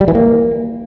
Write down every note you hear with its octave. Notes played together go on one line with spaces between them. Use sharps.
G3
E3
A#3